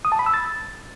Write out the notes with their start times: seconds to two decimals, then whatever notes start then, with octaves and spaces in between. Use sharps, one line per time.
0.05 D#6
0.12 A5
0.19 B5
0.26 E6
0.34 A6